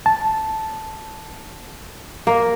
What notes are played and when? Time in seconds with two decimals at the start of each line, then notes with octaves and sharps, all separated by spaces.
0.06 A5
2.27 A#3